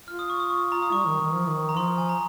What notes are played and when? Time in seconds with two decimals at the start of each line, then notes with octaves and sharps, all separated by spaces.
0.08 F4 F6
0.19 D#6
0.30 C#6
0.40 D#6
0.50 C#6
0.72 A#5
0.82 D#6
0.92 G3 C#6
1.07 D#3
1.21 D#3
1.34 F3
1.48 D#3
1.69 A#5
1.77 F3 C6
1.98 G#5
2.09 A#5